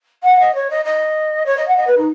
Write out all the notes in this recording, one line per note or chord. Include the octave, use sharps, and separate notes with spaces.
F#5
D#5
C#5
D#5
D#5
C#5
D#5
F#5
D#5
B4
D#4